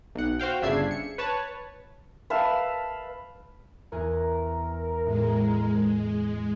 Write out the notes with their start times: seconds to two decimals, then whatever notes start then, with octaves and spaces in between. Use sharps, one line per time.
0.15 B1 F#5
0.39 F#4 C5 F5 G5
0.62 G1 C#3 D4 E5 G#6 C7
0.91 C#7
1.18 B4 C#5 A5
2.30 B4 E5 F5 A5
3.92 E2 A#4 G#5 F#6
5.06 A2 G#3